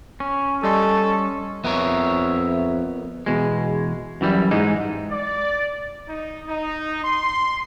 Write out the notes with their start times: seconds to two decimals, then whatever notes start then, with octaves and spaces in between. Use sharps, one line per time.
0.20 C#4
0.64 G3 A4 D#5 C6
1.64 F2 B3 A#4 C#5 E5
3.26 E2 B2 G#3
4.21 F#2 E3 G3
4.51 G#2 E3 G#3 D#4
5.10 D5
6.08 D#4
6.47 D#4
7.03 C6